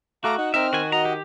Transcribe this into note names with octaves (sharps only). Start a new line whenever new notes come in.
A3 F#4 F5 A#5 D6
D#4 F#5
C4 D#4 A#4 E5 F6
D#3 F#4 G#5
F#4 D#5 A#5
G4